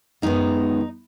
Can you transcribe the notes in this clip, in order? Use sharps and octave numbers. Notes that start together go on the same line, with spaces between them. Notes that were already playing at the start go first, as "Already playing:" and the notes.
F#2 D#3 G#3 B3 D#4